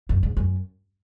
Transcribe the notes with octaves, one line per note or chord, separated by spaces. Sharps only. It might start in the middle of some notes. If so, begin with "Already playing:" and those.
F#2
G#2
F#2